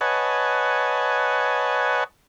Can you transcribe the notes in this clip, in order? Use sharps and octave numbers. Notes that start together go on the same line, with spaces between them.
B4 C#5 D#5 F#5 G#5 A5